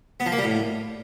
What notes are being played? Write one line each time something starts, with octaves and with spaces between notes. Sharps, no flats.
B3
F3
A#3
G3
A2